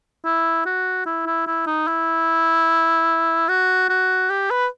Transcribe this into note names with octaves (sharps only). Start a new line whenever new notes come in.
E4
F#4
E4
E4
E4
D#4
E4
F#4
F#4
G4
B4